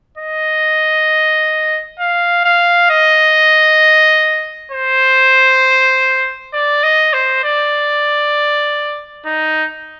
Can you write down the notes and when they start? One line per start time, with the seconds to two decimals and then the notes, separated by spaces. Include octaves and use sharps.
0.18 D#5
1.99 F5
2.45 F5
2.90 D#5
4.72 C5
6.53 D5
6.83 D#5
7.13 C5
7.44 D5
9.26 D#4